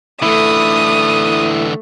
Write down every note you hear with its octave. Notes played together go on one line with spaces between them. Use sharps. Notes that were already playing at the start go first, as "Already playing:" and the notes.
D3 E3 A3 E4 D#6